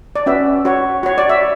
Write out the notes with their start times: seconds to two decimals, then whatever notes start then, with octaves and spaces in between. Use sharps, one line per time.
0.16 D5
0.26 C#4 F#4 B4 E5
0.65 F#4 C#5
1.03 F#4 C#5
1.18 D5
1.29 E5